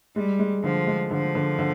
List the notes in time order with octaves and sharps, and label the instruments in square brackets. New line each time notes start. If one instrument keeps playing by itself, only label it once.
[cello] G3 [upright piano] G#3
[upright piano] G#3
[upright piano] D3 [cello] F3
[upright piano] G#3
[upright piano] D3 [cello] F3
[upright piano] D3
D3